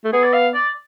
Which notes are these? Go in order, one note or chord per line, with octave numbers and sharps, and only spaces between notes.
A3
B3 G#4
D5
F5
D5